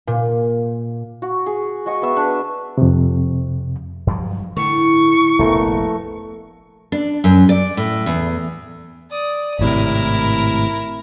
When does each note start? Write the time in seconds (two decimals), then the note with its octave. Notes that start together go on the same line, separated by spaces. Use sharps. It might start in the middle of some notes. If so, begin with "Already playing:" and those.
0.07 A#2
1.22 F#4
1.46 G#4
1.86 G#3 F#4 D#5 C#6
2.02 B3 E5
2.17 D4 B4
2.78 F2 C3
4.07 G2 F3 F#3
4.57 A2 D3 C#6
5.39 F1 A#1 A3 B3 A#4 B4
6.92 D4
7.24 F#2
7.49 D5
7.77 A2
8.06 E2
9.11 D5 D#6
9.59 G#1 A2 C3 E4 A#4